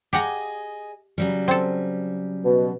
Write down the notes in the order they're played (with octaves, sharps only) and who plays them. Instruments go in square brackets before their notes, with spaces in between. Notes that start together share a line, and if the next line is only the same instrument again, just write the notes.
[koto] G4 F#5 A#5 [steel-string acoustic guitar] G#4 D#5
[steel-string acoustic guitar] C#3 F#3 G3
[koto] C4 A4
[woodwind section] B2